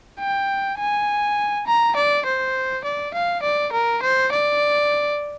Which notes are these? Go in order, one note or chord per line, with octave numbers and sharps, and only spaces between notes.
G5
G#5
A#5
D5
C5
D5
F5
D5
A#4
C5
D5